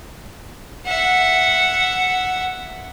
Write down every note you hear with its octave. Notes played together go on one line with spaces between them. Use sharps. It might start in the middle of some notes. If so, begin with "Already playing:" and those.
E5 F#5